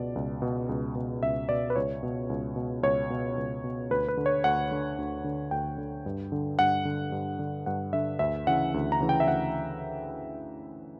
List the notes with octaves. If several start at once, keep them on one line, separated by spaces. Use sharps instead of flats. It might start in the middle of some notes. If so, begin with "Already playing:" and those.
Already playing: C#2 B2 D5
C#2
B2
C#2
B2
C#2 E5
B2 D5
B4
C#2 C#5
B2
C#2
B2
C#2 C#5
B2
C#2
B2
D2 B4
B4
D3
C#5
D2 F#5
D3
D2
D3
D2 G5
D3
G2
D3
G2 F#5
D3
G2
D3
G2 F#5
D3 E5
D2 E5
C#3 E3 F#5
D2
A#5
C#3 E3
G5
E5
D2 F#5